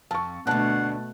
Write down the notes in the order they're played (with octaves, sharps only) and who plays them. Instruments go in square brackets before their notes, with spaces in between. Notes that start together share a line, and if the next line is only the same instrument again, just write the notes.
[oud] F2 [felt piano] A5 C#6
[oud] D2 D4 [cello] B2 A3 [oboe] F#5 [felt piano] A5 F#6